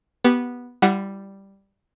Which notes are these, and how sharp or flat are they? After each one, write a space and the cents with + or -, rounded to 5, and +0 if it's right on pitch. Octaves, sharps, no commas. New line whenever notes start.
B3 -10 G4 -10
G3 +0 E4 +35 F#5 +0